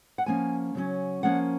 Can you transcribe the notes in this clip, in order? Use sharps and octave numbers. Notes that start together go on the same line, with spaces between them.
F#5
F3 A#3 C#4 G#5
C#3 F#3 C#4
F3 A#3 C#4 F#5